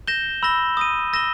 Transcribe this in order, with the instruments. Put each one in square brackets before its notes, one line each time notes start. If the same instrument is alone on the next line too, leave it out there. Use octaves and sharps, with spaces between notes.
[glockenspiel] G6 A#6 E7 G7
B5 E6 A#6 E7 G7
D#6 A#6 D#7
E6 A#6 E7 G7